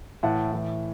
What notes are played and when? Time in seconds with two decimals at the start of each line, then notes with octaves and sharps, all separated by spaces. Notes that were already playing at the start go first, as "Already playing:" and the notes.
0.23 A2 E3 F#5 A5
0.52 A2 E3